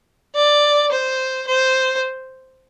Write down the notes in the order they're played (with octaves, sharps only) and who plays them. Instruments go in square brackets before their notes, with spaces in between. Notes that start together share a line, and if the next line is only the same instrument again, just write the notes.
[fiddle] D5
C5
C5